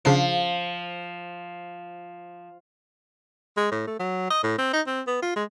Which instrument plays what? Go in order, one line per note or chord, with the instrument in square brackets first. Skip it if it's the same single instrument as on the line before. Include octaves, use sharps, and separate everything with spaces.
[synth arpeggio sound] C#3 D4 C7 [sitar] F3
[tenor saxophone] G#3
A2
A3
F#3
D#5
A2
C4
D#4
C4
B3
F4
G#3